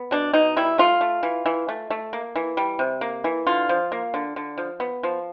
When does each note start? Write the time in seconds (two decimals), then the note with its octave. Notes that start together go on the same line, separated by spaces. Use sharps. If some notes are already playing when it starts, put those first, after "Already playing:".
Already playing: B3
0.11 B2 D4
0.33 B2 D#4
0.56 G3 E4
0.78 A3 F4
1.01 A3
1.23 E3
1.46 E3
1.69 A3
1.90 A3
2.13 A#3
2.36 E3
2.57 G3
2.79 C3
3.01 A#3
3.24 E3
3.47 D3 F4
3.69 F3
3.92 A#3
4.14 D3
4.36 D3
4.58 F3
4.80 B3
5.03 F3